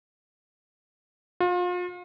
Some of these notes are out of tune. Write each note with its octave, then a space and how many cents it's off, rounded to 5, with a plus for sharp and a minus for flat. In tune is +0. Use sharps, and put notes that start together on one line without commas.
F4 +35